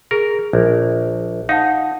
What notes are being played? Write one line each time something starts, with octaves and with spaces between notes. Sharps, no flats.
G#4 A#4
A#1
D#4 F5 F#5 A5